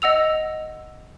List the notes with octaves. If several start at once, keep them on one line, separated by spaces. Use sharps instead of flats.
D#5 F#5 E6 F7